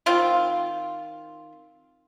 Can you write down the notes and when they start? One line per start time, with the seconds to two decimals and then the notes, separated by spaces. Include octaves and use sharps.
0.06 D#3 C4 F4